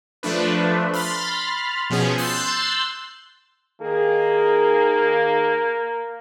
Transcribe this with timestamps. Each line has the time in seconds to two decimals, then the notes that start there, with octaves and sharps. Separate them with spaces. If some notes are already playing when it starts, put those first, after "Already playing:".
0.23 F3 A3 D4 B4
0.93 B5 C6 F6 A6
1.90 B2 F3 B3 C#4 G#4
2.18 C6 E6 F#6 G6 A6 C7
3.81 D#3 A#3 G#4